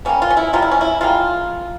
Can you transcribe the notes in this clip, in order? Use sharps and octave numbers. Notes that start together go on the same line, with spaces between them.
C#3 G3 A#3 C#4
F4
C#4
E4
C3 G3 A#3 F4
E4
C#4
E4
C#3 G3 A#3 F4